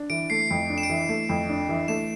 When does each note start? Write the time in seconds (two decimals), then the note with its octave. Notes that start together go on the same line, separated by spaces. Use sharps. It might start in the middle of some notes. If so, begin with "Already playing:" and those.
Already playing: D4
0.10 E3 D7
0.30 A3 C7
0.50 F2
0.70 D4
0.78 E7
0.83 D7
0.90 E3
1.09 A3
1.29 F2
1.49 D4
1.69 E3
1.88 A3 E7